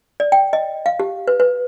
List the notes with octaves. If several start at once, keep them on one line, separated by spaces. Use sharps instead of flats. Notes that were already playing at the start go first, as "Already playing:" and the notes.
D5
G5
D#5
F5
G4
B4
B4